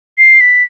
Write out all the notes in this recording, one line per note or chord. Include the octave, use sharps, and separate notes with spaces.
C7
B6